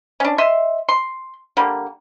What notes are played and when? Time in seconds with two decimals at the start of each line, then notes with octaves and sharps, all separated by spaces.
0.20 C#4 D4
0.38 D#5 E5 C6
0.89 C6
1.57 D3 G3 A#3